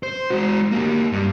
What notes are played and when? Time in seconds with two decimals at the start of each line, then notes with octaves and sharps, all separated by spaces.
0.03 C5
0.30 G#3 F#4
0.71 A#3 G4
1.12 G2